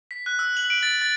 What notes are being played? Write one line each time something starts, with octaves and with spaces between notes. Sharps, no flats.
B6
F#6
E6
F#7
D7
A6
A6